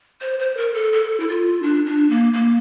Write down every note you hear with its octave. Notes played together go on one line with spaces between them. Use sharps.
C5
C5
A#4
A4
A4
E4
F4
D4
D4
A#3
A#3